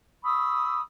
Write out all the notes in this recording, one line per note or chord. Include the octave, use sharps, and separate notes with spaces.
B5 C#6 D#6 E6